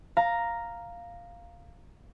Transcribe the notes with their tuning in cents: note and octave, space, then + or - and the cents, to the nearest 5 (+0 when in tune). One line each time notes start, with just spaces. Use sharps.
F5 +0 A#5 +0